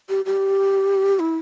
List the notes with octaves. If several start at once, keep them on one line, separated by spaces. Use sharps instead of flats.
G4
G4
E4